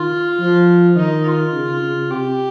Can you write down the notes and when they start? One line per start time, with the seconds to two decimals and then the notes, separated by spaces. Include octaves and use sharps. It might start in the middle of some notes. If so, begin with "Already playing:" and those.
Already playing: D#3 F4
0.40 F3
0.96 D#3 D#4
1.25 F4
1.54 C#3
1.82 C#3
2.10 C3 G4